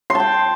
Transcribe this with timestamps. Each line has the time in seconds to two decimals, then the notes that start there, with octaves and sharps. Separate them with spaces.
0.10 C6
0.15 A5
0.20 G5